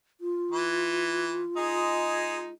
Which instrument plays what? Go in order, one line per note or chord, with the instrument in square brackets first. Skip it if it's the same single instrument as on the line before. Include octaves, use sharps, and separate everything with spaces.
[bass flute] F4
[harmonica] E3
G#3 D#4 G#4